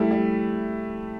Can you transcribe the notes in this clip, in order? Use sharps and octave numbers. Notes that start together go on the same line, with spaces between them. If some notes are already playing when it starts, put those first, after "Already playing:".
Already playing: G3 A3 E4
G3